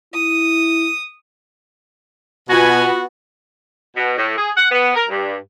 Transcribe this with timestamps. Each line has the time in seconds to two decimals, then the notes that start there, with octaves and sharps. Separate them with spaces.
0.14 E4 D#6
2.49 B2 B3 F4 F#4 G#5 A#6
3.96 B2
4.17 A2
4.38 G#4
4.57 F#5
4.71 B3
4.95 A#4
5.09 G2